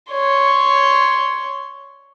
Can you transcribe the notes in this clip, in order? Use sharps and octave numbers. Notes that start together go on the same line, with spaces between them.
C#5 C6